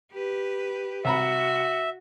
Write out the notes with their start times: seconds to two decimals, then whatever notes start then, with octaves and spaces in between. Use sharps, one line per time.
0.12 G4 B4
1.05 C2 F#4 E5 A#5 B5